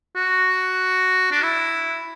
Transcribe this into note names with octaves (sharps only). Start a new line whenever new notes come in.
F#4
D4
E4